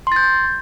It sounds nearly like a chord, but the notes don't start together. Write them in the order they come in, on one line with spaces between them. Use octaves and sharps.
C6 A6 G6